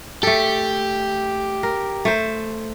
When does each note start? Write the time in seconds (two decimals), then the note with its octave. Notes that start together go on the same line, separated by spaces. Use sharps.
0.23 A3 G4 A4
1.63 A#4
2.05 A3 C5